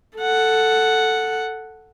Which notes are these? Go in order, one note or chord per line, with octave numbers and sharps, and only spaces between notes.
A4 F#5